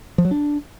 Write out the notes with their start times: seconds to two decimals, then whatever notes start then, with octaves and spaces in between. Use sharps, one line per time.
0.18 F3
0.25 F#3
0.31 D4